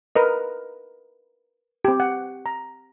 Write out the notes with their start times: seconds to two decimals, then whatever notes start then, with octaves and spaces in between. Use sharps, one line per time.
0.16 A#4 B4 D#5
1.85 C4 G4
2.00 F#5
2.46 A#5